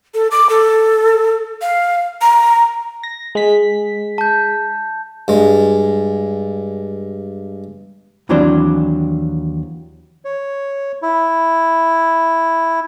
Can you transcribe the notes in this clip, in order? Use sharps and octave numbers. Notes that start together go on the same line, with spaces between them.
A4
D6
A4
F5
A#5
A#6
G#3 B6
A5 G6
G2 G#3
D#2 E3 F#3 C4 D4 C5
C#5
E4